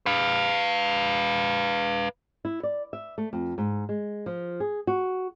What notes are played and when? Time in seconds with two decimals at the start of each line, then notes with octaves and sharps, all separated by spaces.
0.06 B4 F5
2.45 E4
2.63 D5
2.93 E5
3.18 A3
3.33 F2
3.58 G#2
3.89 G#3
4.26 F3
4.60 G#4
4.87 F#4